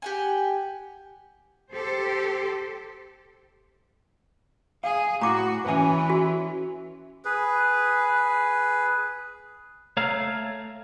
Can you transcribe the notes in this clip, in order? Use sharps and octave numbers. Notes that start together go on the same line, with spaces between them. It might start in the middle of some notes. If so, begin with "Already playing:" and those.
G4 F#5 G#5
G4 A4 C5
G#4 F5
A2 F#4 A#5 D6
E3 C#4 B4 G#5
F#4
G#4 B4
A3 C#5 F5 A#5 F6